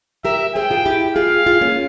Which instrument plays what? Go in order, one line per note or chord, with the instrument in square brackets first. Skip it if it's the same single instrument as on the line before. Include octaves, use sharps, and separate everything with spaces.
[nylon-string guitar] G4 A#4 [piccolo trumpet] E5
[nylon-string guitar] G#4 C5 [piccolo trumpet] G5
[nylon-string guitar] F4 G#4
E4 G4
[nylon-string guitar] F4 G#4 [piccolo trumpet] F5
[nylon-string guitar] F4 G#4
A#3 C#4